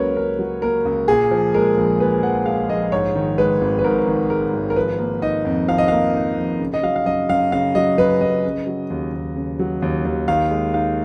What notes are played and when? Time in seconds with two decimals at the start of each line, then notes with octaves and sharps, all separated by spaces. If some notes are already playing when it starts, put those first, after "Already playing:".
Already playing: C#2 C#3 F#3 A#3 A#4 B4 C#5
0.16 C#3 A#4
0.39 F#3
0.62 A#3 A#4
0.85 C#2
1.08 A#2 G#4
1.31 F3
1.54 G#3 A#4
1.77 A#1
2.00 A#2 B4
2.23 F3 F#5
2.46 G#3 F5
2.69 A#1 D#5
2.92 G#2 C#5
3.15 D#3
3.38 G#3 B4
3.61 G#1
3.79 B4
3.84 G#2 A#4
4.07 D#3
4.30 G#3 A#4
4.53 G#1
4.70 A#4
4.76 F3 B4
4.99 A#3
5.22 D#4 D#5
5.45 F2
5.68 F3 F5
5.78 D#5
5.88 A#3 F5
6.14 D#4
6.37 F2
6.60 C#3
6.74 D#5
6.83 F#3 F5
6.96 F5
7.06 F#2 D#5
7.29 F#2 F5
7.52 C#3 F5
7.75 F#3 D#5
7.98 F#2 B4
8.21 F#2 D#5
8.44 C#3
8.67 F#3
8.90 D#2
9.13 D#2
9.36 C#3
9.59 F#3
9.82 D#2
10.05 D#2
10.28 D#3 F5
10.51 G#3
10.74 D#4 F5